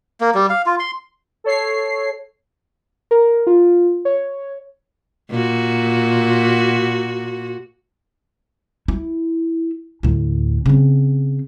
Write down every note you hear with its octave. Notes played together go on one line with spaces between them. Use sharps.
A#3
G3
F5
F4
C6
A4 C#5 C7
A#4
F4
C#5
A#2 F#4
E4
D2 A2
C#3 C4